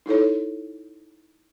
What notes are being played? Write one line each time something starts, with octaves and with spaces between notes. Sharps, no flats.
D#4 E4 A4 C#5